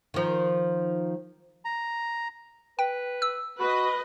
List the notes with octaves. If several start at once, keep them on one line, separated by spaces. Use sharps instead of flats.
D#3 F3
A#5
B4 G5
E6
F#4 B4 D#5 B5